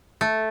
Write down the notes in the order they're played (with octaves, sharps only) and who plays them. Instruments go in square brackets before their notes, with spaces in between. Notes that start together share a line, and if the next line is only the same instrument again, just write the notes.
[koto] A3